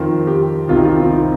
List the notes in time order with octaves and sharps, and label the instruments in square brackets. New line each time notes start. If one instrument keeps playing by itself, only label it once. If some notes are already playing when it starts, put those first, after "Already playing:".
Already playing: [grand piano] F2 D#3 F4
G4
C2 C3 D#3 F4
D#4
F4
C4
D#4